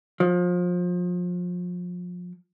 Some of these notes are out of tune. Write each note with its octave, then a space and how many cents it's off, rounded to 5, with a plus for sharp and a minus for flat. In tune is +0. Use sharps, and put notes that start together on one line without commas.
F3 +30